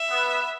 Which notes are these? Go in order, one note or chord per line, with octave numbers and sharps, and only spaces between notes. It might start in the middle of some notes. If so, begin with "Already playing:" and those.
Already playing: E5
B3